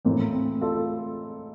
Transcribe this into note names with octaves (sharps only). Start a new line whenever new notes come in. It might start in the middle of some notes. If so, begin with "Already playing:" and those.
A2 E3 A#3 C4
C4
F4 A4